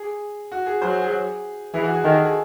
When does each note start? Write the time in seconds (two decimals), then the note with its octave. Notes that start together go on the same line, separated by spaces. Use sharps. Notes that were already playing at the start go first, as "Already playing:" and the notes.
Already playing: G#4
0.52 F#4
0.66 G#4
0.82 F#3 C5
1.02 G#4
1.74 E3 G#4
1.84 F#4
1.94 G#4
2.04 D#3 A4
2.14 G#4
2.25 G#4